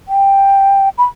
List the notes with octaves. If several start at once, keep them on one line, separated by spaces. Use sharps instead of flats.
G5
B5